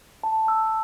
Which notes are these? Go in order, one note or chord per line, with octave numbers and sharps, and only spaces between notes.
A5
E6